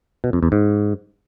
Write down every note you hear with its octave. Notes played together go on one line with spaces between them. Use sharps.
B2
F2
E2
G#2